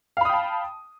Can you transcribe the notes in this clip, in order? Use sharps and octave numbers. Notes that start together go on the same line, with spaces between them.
F5 G5 A5 B5 D#6